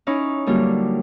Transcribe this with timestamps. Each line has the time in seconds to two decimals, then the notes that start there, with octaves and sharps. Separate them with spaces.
0.07 C#4 D#4 E4
0.46 D3 F#3 G3 A#3